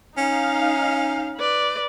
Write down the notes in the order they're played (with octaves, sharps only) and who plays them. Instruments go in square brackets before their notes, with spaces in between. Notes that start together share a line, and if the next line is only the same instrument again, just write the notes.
[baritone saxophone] C#4 [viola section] D#4 F5
[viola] B4 D5